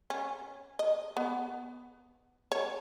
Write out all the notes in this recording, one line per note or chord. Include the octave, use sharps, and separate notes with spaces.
C#4
D#5
B3
C#5